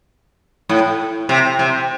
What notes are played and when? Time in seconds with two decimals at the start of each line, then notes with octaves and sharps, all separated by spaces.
0.69 A2
1.29 C3
1.59 C3